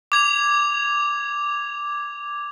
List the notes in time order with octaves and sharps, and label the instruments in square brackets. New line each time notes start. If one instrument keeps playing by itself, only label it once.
[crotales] D6 G#6 F7